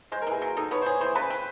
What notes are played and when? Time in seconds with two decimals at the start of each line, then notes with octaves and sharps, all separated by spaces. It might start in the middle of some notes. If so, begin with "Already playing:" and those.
0.12 G#3 C5
0.22 A#4
0.27 E3 G#4
0.42 F#3
0.57 D#4 A4
0.71 B3 C#5
0.82 C5
0.86 G#4 C#5
1.00 E3 C5
1.15 C#3 B4
1.30 C4